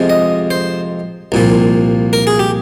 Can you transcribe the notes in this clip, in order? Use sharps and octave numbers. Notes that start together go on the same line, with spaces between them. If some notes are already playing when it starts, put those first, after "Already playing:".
Already playing: F2 C3 F3 G#3
D#5
C5
C2 A#2 F3
A#4
G#4
G4